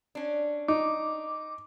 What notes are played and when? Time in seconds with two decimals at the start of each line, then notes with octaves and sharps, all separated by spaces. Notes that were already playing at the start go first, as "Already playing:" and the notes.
0.15 C#4 D4
0.68 D#4 D6